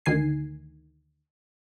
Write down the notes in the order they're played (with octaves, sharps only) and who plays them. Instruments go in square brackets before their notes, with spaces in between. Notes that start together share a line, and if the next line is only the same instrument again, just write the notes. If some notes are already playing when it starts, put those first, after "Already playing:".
[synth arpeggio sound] D2 D#3 G#5 C7